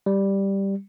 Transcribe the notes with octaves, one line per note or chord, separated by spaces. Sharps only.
G3